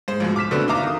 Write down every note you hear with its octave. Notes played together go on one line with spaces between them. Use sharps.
G#2 C5
A#1 G#2 B2
D6 F6 B6 E7
B2 D3 A3 B3 C4
D#4 E5 F5 A#5 D6
D#3 D#6